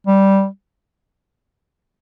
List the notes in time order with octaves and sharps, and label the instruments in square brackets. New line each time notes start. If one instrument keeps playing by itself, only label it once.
[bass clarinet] G3